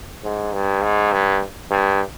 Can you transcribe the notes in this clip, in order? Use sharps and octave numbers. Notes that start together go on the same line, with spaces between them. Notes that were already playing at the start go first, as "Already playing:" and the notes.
G#2
G2
G#2
G2
G2